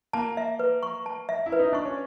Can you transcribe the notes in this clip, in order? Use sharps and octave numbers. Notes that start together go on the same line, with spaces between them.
A#3 A5
E5
B4
C#6
A5
E5
E4
B4
D#4
D4 C#6
C#4